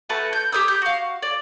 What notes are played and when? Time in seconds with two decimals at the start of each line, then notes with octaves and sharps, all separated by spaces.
0.09 A3 F#4 B4 A5
0.33 G6
0.52 G4 C5 D#6 E6
0.68 G6
0.82 F#4 F5
1.23 D5